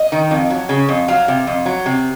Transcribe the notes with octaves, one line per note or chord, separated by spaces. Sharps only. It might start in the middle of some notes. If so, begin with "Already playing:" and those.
Already playing: D#5
D#3
F2
F#3
C#3
F2
F#3 F5
C3
F2
F#3
C3